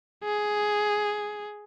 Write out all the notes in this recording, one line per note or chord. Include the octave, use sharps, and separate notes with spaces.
G#4